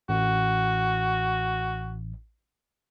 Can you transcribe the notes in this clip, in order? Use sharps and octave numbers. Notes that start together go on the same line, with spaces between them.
A1 F#4